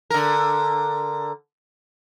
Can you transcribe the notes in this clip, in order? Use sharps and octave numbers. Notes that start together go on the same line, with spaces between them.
D3 A#4